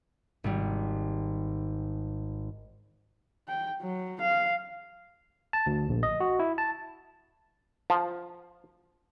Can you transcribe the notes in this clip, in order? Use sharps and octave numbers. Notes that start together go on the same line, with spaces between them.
G#1 G3
G5
F#3
F5
A5
D2
A#1
D#5
F#4
E4
A5
F3